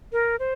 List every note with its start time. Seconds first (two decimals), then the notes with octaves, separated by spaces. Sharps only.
0.12 A#4
0.39 C5